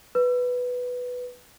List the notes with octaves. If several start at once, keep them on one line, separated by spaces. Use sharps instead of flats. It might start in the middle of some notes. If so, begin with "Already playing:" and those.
B4